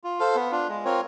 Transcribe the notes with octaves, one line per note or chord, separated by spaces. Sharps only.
F4
A4 C5 F5
B3
D4 F4
G#3
C4 F4 A#4 C#5